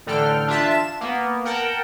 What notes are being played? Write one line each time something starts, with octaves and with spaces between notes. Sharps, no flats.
A1 D3 D4 A4 G5 F6
D4 F4 E5 A5
E7
A#3 B3
A#4 F#5 G5 A5